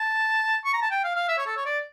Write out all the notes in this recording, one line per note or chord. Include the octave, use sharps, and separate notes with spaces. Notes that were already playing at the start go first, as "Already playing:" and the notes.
Already playing: A5
C#6
A#5
A5
G5
F5
F5
E5
C#5
A4
C#5
D5